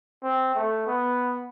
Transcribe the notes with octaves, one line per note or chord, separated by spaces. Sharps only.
C4
A3
B3